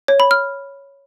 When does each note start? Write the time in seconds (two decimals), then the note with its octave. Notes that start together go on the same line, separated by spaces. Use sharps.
0.08 C#5
0.20 B5
0.31 F6